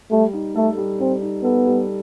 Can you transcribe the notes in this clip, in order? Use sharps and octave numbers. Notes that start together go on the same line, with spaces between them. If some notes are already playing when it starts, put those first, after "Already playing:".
G3 A3
D#4
A3 A4
G3
G3 C4
D#4
B3 A4
G3